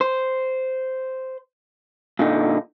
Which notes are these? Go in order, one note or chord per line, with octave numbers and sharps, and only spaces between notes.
C5
A#2 D3 D#4